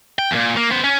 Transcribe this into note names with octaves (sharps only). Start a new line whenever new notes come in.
G5
E2 A#2
A#3
B3 C5
C#4